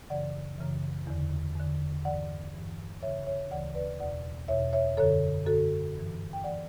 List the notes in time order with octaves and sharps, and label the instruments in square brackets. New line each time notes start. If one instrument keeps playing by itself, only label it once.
[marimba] F#2 C#3 E3 D5 F#5
F#2 C#3 E3
E2 D3
E2 D3
G2 E3 D5 F#5
G2 E3
D2 C#3 E3 C#5 E5
C#5 E5
D2 C#3 E3 D5 F#5
B4 D5
E2 B2 D5 F#5
E2 B2 C#5 E5
C#5 E5
F#2 D3 A4 C#5
F#2 D3 F#4 A4
G2 E3
G5
E3 D5 F#5